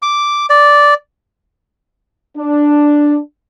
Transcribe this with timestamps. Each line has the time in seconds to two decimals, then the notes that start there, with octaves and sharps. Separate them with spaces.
0.02 D6
0.50 D5
2.38 D4